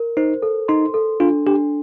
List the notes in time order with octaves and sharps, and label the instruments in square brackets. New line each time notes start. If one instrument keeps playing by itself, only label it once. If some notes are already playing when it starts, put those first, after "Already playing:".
Already playing: [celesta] A#4
[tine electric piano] D#4 [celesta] C5
[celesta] A4
[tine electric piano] D#4 [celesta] C6
[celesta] A4
[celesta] D4 [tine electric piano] F4
[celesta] D4 [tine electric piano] G4